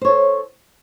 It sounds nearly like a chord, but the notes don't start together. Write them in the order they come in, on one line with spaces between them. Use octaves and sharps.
C5 C#5 A4